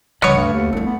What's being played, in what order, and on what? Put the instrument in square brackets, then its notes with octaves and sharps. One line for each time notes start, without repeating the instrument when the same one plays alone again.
[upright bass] C#2 G3 [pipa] B3 C#5 [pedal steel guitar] D#5 F#5 D#6
[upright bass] D2 [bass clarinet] G2 [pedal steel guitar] A3 F#5 F6
[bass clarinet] D#2
[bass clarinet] C2 [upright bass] C4 D4
[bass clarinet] B3